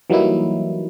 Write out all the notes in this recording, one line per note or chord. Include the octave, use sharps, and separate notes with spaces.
E3 F#3 G3 A#3 D#4 E4